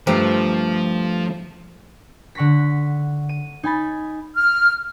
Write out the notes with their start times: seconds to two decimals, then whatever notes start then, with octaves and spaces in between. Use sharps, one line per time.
0.07 G2 F3 A3 G4 C5 A#5
2.35 D3 F#5 C#6 A#6 B6
3.29 D#7
3.63 D#4 G#5 B5 A6
4.36 F6